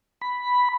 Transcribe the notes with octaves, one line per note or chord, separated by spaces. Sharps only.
B5